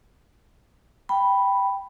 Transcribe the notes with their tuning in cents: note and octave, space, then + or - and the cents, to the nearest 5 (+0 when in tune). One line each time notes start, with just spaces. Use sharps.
G5 +0 B5 +0